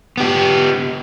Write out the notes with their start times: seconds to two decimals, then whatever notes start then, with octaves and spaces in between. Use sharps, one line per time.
0.17 B3 G4